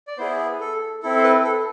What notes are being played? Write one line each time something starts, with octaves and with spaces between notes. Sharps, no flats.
D5
B3 E4 G#4 C5
A4
C4 E4 A4
C5
B4
A4